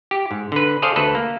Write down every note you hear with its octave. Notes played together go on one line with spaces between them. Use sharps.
G4
G#2
D3 B4
G#4 A4 C5 D5 D#5 F5
D2 A4 B4
A#3